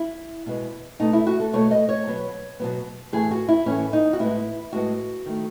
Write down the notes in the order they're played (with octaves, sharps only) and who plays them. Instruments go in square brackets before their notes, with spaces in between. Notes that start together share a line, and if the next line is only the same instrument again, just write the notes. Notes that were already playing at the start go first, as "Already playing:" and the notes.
Already playing: [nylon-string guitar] E4
B2 G#3 B3
B2 A3 D#4
E4
F#4
A4
B2 A3 C#5
D#5
C#5
B2 F#3 B3
B2 F#3 B3
A2 E3 A3 G#4
F#4
E4
A2 E3 A3 C#4
D#4
F#4
A2 G#3 B3 E4
A2 G#3 B3 F#4
D#3 A3